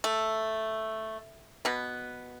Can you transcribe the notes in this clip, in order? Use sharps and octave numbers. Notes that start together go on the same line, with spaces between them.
A3
B2 B3